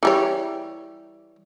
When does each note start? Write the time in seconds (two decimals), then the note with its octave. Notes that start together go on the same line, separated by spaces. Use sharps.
0.03 E3 G3 C#5